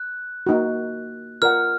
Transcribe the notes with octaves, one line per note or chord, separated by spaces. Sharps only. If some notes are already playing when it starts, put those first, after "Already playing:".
Already playing: F#6
A#3 D#4 F#4
F4 A#4 D5 F#5 F6